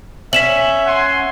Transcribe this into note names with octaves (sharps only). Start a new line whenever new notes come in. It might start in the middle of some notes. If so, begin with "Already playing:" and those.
C#4 E5 B6 E7 F#7
F#5 G#5 C6